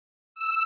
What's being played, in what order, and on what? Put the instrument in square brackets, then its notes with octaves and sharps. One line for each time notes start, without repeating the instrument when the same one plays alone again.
[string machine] E6